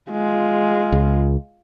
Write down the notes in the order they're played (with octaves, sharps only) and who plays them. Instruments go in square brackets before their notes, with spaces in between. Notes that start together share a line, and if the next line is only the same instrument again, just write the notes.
[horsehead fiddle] G#3 F4
[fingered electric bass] C#2